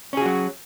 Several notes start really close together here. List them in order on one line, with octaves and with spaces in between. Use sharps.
C#4 G#4 F#4 F#3